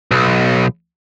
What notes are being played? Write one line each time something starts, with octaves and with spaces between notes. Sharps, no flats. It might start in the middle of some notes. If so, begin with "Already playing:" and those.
B1